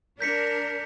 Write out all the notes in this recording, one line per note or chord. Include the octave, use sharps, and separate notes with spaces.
D4 A#4 G6 B6 C#7